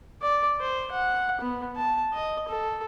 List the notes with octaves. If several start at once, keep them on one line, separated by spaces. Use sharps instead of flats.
D5
C5
F#5
B3
A5
D#5
A4